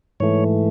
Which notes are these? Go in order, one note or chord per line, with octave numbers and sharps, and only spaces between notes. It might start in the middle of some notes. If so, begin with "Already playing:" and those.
G#2 E3 A3 C#5